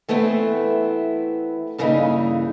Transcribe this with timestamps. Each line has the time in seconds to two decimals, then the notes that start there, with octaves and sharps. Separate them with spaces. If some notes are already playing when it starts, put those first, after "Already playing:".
0.08 E3 A3 B3 C4 E4
1.78 G2 C#3 E3 A#3 B3 D#4